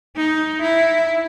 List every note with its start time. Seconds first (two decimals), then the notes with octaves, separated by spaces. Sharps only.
0.16 D#4
0.62 E4